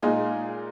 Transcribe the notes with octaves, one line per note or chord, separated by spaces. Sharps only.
A#2 G#3 D#4 F4 G#4